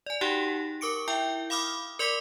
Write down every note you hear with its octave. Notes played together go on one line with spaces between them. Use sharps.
D5 G#5
D#4 F#4 G4 F#5 G5 C6
A#4 C#6 D6 C#7 D7
E4 E5 G5
F5 B5 D6 D#6 F6
A#4 D5 C6 D6 B6